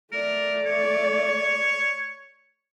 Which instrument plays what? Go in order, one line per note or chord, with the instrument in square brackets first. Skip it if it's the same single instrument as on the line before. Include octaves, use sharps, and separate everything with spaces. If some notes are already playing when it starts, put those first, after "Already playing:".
[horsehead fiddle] A3 D5 [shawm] A#4
[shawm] C#5